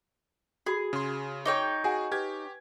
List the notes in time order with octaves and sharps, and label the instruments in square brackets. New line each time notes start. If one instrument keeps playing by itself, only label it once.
[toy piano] F#4 B5 [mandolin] G#4
[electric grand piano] C#3 C6
[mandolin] D#4 C#5 G5 [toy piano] G#4
[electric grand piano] F#4 G#4 [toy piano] F#5 G#5
[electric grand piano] G4 G#6 [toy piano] B4